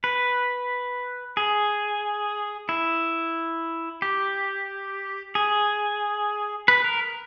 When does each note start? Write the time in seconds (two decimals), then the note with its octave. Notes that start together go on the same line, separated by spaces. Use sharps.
0.04 B4
1.37 G#4
2.69 E4
4.02 G4
5.35 G#4
6.68 B4
6.84 A#4